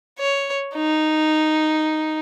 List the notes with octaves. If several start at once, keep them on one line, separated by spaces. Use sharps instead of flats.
C#5
D#4